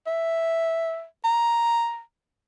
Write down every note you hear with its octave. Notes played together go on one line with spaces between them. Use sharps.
E5
A#5